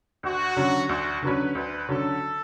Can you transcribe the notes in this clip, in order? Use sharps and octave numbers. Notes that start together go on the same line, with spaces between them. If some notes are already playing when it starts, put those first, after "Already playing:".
D2 F#4
D3 F#3 C#4
D2 F#4
D3 F#3 C#4 B4
D2 B4
D3 F#3 C#4 A4